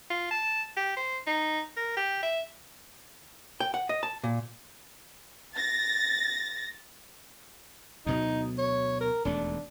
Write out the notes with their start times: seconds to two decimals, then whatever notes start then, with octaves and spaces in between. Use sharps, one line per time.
0.10 F4
0.31 A5
0.77 G4
0.97 C5
1.27 D#4
1.77 A#4
1.97 G4
2.23 E5
3.60 G5
3.74 F#5
3.89 D#5
4.03 A5
4.24 A#2
5.56 A6 A#6
8.06 D2 B2 F#3 D#4
8.58 C#5
9.01 A#4
9.25 E1 D#2 A3 D4